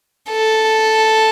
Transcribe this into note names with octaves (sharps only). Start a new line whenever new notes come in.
A4